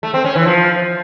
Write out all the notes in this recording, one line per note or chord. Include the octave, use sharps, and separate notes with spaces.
A3
C4
C#4
E3
F3